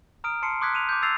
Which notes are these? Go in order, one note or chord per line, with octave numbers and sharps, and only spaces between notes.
A#5 D#6 F6 D7
A5 C6 C7 C#7
C6 D6 D#6 F#6 G#6 B6
F#6 D#7 F7
D6 G6
E6 G#6 A6 C7 F7